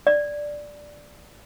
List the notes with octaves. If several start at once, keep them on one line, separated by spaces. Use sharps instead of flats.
D5